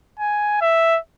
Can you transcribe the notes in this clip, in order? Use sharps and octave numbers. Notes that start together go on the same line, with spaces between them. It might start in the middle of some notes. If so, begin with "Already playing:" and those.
G#5
E5